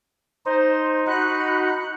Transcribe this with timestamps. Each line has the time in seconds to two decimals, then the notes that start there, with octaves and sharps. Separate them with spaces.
0.46 D#4 C5 C6
1.07 D#4 F#4 F#5 B5 F#6 C#7